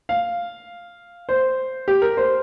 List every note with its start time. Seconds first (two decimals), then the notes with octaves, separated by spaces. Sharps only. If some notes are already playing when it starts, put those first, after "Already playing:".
0.09 F5
1.29 C5
1.88 G4
2.02 A#4
2.17 C5